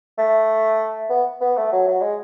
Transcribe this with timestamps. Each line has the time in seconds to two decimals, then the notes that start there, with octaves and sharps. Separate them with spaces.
0.18 A3
1.10 B3
1.41 B3
1.57 A3
1.72 F#3
1.88 F#3
2.02 G#3